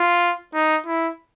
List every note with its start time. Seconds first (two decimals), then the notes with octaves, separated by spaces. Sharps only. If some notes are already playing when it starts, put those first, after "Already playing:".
Already playing: F4
0.54 D#4
0.87 E4